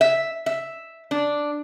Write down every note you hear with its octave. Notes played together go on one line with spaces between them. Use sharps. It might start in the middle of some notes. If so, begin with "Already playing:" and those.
E5
E5
D4